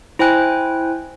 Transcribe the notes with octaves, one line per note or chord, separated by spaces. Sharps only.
E4 C5 G5 G#5 F#6